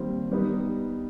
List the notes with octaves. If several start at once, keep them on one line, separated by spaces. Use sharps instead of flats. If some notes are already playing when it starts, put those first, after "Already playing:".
Already playing: D#2 D#3 G3 C4
G3 B3 D#4